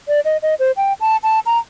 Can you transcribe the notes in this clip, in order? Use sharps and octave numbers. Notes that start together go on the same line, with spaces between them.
D5
D#5
D#5
C5
G5
A5
A5
A#5